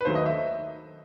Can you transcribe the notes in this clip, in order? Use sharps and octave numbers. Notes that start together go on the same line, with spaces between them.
B4
D#2 D#3 F#3 A3 C5
D#5
E5